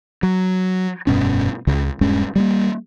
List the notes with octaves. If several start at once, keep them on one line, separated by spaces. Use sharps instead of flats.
F#3
F1 G2 B2 C#4
C#2 C#3
D#1 G2 G#3 C#4
G3 G#3 A#3